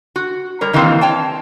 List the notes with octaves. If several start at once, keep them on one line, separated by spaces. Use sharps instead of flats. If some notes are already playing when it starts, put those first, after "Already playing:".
F#4
G3 A#4 C#5
D#3 E3 G3 A#3 C4
C#5 G5 A5